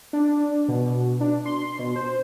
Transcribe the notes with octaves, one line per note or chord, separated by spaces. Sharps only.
D4
B2
D4
C6
B2
C5